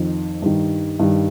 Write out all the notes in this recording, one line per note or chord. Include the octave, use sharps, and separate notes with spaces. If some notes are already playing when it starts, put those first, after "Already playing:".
Already playing: F2 D#3
G2 D#3
G2 D#3